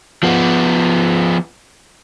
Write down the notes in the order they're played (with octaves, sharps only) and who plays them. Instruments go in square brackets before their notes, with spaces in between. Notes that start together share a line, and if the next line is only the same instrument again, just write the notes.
[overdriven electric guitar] F3 B3